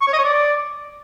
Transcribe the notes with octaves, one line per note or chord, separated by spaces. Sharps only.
C#6
C#5
D#5
C#5
D5